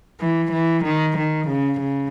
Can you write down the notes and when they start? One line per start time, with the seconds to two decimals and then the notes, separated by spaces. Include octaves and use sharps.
0.20 E3
0.52 E3
0.84 D#3
1.16 D#3
1.48 C#3
1.79 C#3